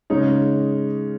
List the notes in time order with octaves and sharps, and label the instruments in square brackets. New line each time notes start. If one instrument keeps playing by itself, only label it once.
[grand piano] C#3 G#3 C#4 D#4